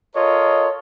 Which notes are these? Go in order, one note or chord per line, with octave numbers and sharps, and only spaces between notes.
F4 A4 A#4 C#5 D#5